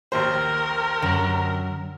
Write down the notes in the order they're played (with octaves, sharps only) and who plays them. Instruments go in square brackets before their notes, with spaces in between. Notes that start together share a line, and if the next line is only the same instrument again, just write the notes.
[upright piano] A#1 D#2 C5 [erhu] A#4
[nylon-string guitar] F#2 [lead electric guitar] D3 A#5